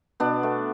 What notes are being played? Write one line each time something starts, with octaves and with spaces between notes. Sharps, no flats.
B2 B3 D4
A3